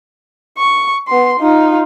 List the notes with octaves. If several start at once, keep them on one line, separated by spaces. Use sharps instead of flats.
C#6
B3 C6
D#4 F4